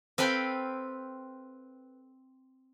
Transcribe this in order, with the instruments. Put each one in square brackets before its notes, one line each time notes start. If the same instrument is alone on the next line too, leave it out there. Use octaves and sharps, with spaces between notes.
[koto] C4 A4 B4 F5 G5